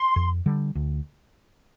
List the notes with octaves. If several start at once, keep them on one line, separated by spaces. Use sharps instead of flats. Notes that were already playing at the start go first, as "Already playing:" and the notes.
Already playing: C6
F2
D3 G3
D2